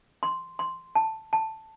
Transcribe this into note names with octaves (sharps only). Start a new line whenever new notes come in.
C6
C6
A5
A5